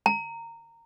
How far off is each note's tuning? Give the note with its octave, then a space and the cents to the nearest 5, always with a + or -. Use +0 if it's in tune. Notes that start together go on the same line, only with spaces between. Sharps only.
A#5 -20